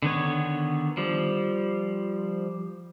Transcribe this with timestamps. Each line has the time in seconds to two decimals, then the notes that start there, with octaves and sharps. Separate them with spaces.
0.03 D3 D#3 B3 C#5
0.97 F3 G3